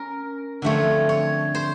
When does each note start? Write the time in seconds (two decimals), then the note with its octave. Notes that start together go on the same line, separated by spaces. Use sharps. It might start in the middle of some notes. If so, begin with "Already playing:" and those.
Already playing: C#4 A#4
0.62 D3 F3 A3 C4 C#5
1.09 C#5
1.55 C5